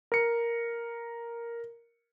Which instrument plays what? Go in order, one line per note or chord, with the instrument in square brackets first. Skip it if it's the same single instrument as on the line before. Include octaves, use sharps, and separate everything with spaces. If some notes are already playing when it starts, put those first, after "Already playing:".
[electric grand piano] A#4 C#7